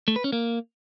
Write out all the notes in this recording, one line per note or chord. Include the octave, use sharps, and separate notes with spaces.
A3
B4
C#4
A#3